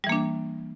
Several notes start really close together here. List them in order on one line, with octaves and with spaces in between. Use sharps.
G3 E3 A#3 D4